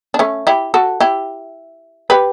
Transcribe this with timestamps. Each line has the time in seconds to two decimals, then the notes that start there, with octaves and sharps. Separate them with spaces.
0.14 D4
0.19 A3 C#4
0.47 E4 G4
0.74 F#4 A4
1.00 E4 G4
2.10 G4 B4